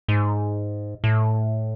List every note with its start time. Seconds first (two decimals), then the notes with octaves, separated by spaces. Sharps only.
0.08 G#2
1.04 A2